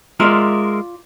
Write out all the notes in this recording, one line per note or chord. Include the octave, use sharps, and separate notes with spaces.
G#3 F4 A#4 D5 E5